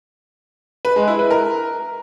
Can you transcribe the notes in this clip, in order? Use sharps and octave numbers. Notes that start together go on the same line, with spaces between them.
B4
G#3
E4
B4
A#4